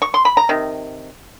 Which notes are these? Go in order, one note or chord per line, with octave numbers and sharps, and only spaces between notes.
C#6
C6
B5
A#5
C3 D#3